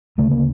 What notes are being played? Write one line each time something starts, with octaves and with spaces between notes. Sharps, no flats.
D2 C#3 A3
A#3